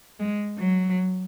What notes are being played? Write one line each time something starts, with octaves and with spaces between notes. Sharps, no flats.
G#3
F#3